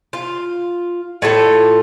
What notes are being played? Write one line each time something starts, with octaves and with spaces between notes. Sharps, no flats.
F4
A2 F4 A4